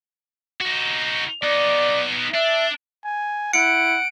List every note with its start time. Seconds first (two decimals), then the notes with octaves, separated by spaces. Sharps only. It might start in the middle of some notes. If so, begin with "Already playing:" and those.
0.61 D#4 F#4
1.43 B3 D#4 D5
2.34 D4 E5
3.05 G#5
3.53 E4 F#5 C#7 D7